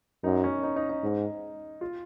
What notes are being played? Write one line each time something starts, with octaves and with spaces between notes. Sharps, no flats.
F#2 D#4
C#4
D#4
D#4
D#4
G#2
F4